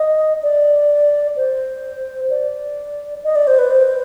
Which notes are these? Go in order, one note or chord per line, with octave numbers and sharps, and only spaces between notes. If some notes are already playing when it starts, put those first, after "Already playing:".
Already playing: D#5
D5
C5
D5
D#5
D5
C5
B4
C5